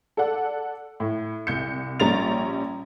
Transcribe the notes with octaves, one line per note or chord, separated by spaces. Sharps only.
A4 D5 F#5
A2
C2 G6 C#7
A#1 G3 C#4 A#5 A6 F7